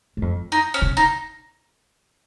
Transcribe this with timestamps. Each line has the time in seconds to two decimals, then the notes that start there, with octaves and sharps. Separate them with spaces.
0.17 G#2
0.22 F2
0.52 D#4
0.74 C#4
0.82 C#3
0.97 D#4